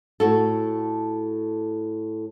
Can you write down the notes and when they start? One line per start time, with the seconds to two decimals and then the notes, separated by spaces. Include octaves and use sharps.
0.20 A2 F#4 A4